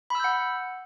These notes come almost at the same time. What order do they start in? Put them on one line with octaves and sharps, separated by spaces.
B5 E6 G6 F#5